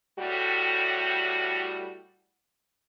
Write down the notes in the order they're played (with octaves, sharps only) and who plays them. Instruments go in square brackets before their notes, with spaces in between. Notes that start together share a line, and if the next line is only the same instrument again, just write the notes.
[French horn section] A2 G3 F#4